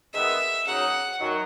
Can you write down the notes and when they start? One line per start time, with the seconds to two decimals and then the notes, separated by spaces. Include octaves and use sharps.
0.13 D#3 G#3 B3 E5
0.66 C#3 F#3 A#3 D#4 F#5
1.19 F#2 D#3 F#3